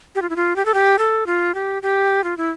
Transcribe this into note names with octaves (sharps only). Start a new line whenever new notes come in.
G4
F4
E4
F4
G4
A4
G4
A4
F4
G4
G4
F4
E4